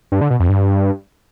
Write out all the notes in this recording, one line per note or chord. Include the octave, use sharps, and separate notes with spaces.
G2
D3
B2
F2
G2